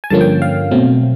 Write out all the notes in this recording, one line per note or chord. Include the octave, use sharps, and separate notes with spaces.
G#5
G2 D3 F3 A#3 C#4 A5
G5
F5
B2 F#3 A3 C4